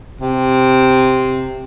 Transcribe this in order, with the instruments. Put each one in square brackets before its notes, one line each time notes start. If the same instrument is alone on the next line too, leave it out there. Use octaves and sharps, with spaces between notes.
[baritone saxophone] C3